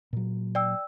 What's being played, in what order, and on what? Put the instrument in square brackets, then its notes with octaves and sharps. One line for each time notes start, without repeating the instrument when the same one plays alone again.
[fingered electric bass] A#2 F#3
[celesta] D5 G5 E6